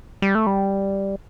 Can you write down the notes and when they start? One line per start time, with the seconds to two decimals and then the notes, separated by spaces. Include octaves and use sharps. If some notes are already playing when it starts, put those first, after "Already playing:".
0.22 G3
0.35 A3
0.47 G3